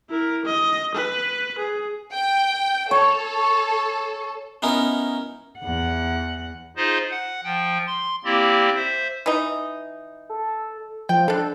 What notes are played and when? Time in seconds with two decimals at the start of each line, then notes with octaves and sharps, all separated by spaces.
0.10 E4 A#4
0.45 D#5
0.95 B4
1.59 G#4
2.13 G5
2.91 A4 C#5
4.62 B3 C#4 D#4 E4 A#4
5.59 E2 F#5
6.77 D#4 F4 G#4 C5 D#5
7.11 F#5
7.44 F3 G5
7.87 C6
8.25 A#3 C4 E4 G4 D5
8.76 C5 E5
9.26 E3 D#4
10.30 A4
11.09 F3 G5
11.28 D3 D4 A4